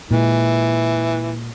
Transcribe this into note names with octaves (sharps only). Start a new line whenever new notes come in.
A#2 E3 G#3